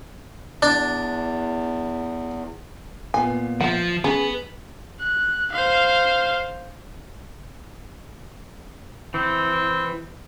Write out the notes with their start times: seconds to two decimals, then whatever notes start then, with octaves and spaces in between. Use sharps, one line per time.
0.62 E2 D4
3.14 A#2 A#3 B3 G#5
3.61 F3 E5 F#5
4.04 B3 C#4 G#4 B4
5.01 F#6
5.52 C5 F5
9.14 E3 C4